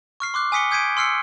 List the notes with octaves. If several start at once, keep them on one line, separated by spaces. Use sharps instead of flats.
C#6 F6 C7
C6 D6 F#6
G#5 D#6 B6 C#7 G7
D#6 G6 G#6 B6 D7 D#7
C6 E6 F6 C7 C#7